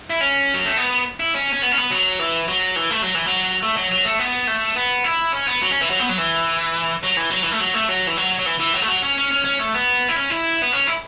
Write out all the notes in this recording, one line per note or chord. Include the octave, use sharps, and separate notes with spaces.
E4
C#4
F#3
A3
B3
E4
C#4
C#4
B3
C#4
B3
F#3
E3
F#3
E3
A3
F#3
E3
F#3
A3
F#3
F#3
A3
B3
A3
B3
E4
C#4
B3
F#3
C#4
E3
F#3
B3
F#3
E3
F#3
E3
F#3
E3
A3
F#3
A3
F#3
E3
F#3
F#3
E3
E3
F#3
A3
F#3
C#4
C#4
C#4
C#4
A3
B3
E4
C#4
E4
B3
C#4
E4